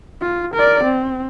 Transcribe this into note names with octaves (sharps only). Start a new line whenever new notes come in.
F4
A#4 D5
C4